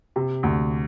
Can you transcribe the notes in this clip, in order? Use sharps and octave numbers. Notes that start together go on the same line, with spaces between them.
C3
D2